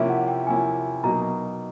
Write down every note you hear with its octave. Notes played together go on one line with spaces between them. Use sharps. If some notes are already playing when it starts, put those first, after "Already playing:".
Already playing: C3 F3 A#3 C#4 E4 E5
F#5
G5
C3 F3 A#3 C#4 E4 G#5
B2 F#3 A#3 D#4 A#5